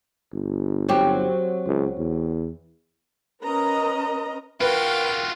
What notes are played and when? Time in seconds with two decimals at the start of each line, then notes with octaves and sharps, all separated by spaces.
0.33 G1
0.89 F#3 C4 G4
1.67 C#2
1.98 E2
3.42 C#4 A#4 B4 D#5 A#5
4.61 F4 F#4 A#4 B4 F5 G5